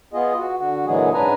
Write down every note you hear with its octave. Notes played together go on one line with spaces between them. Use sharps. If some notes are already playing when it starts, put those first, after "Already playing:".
B3 F4 G#4 D#5
F#4
D3 F#4
A#2 D3 E3 F#3 G#3 G#4
G#2 C#4 D4 B4 G#5 A#5